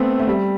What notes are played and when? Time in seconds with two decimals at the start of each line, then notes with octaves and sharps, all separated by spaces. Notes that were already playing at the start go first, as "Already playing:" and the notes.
Already playing: A3 B3 C4
0.20 A3
0.27 G3